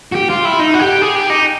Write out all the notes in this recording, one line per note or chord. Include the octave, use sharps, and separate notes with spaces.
F#4
G4
F4
E4
D#4
F#4
G4
G#4
G4
D#4